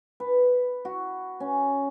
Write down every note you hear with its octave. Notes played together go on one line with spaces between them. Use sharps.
B4
F#4
C#4